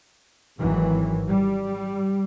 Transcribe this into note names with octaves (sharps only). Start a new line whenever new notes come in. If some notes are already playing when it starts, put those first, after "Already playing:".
G#1 D#3 E3 F#3
G3